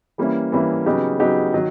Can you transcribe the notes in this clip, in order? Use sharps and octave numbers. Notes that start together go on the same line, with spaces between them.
E3 G3 A#3 C#4 E4
E3 G3 A#3 C#4 E4
C#3 F#3 B3 D#4 G4
C#3 F#3 B3 D#4 G4
D#3 F#3